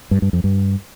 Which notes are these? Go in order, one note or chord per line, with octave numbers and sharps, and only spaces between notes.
G2
G2
F2
G2